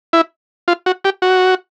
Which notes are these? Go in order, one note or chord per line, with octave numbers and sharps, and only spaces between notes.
E4
F4
F#4
G4
F#4